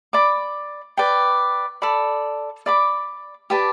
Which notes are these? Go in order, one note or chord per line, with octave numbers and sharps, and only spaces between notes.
D5 B5 D6
B4 D5 G5
A4 D5 B5
D5 B5 D6
G4 B4 D5 A5